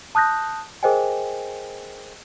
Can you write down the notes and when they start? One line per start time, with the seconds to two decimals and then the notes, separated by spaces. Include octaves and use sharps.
0.15 A5 D#6 F#6 G6 A#6
0.83 G#4 A#4 C5 D#5 G5 G#5